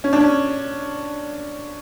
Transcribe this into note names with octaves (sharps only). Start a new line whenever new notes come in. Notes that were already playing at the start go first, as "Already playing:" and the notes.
C#4
D4
C#4